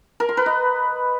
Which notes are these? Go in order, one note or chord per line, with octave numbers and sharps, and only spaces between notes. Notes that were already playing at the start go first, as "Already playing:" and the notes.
A#4
C6
B4
D#5